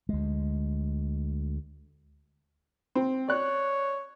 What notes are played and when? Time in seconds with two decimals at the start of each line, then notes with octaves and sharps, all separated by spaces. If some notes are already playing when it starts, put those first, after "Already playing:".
0.09 D2 G#3
2.95 C4
3.29 C#5 D5 F#6